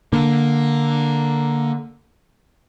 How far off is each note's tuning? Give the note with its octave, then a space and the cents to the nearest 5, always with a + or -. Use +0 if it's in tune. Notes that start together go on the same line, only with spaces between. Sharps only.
D3 +0 A#3 +0